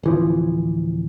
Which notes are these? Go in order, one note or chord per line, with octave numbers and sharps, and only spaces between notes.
D1 E3 F3